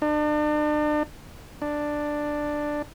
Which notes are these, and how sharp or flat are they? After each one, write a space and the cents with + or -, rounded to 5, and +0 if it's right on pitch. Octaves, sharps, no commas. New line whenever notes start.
D4 +40
D4 +10